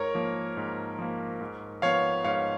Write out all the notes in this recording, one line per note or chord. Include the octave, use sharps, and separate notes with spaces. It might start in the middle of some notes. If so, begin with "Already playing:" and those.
Already playing: G#2 A#4 C#5
F3 A#3
G#2
F3 A#3
G#2
F3 B3 C#5 F5
G#2 C#5 F5